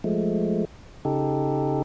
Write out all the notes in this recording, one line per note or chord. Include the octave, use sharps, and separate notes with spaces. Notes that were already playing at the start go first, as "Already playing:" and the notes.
F3 G#3 A3
C#3 D#4 G4 A4